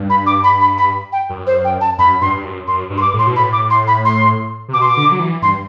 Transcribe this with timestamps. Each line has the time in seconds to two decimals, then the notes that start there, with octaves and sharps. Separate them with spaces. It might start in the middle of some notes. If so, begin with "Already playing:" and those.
Already playing: G2
0.10 B5
0.26 D6
0.44 B5
0.61 B5
0.78 B5
1.13 G5
1.29 F#2
1.47 C5
1.65 G5
1.81 A5
1.98 F#2 B5
2.21 G2 C6
2.37 G2
2.44 F#2
2.67 F#2 C6
2.90 G2
2.97 C6
3.02 D6
3.13 A2
3.19 C6
3.27 B2
3.36 B5
3.39 A2
3.53 D6
3.70 C6
3.87 B5
4.05 C6
4.68 C3
4.74 B2 D6
4.81 C6
4.88 D6
4.97 D3
5.12 F#3
5.19 E3
5.42 G2 C6